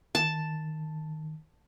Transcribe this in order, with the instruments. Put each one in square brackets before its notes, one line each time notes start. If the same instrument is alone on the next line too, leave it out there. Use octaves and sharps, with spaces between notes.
[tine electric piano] D#3 [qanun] A5